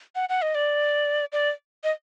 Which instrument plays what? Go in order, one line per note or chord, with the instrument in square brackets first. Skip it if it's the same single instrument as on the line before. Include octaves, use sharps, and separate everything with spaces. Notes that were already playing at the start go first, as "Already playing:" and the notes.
[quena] F#5
F#5
D#5
D5
D5
D#5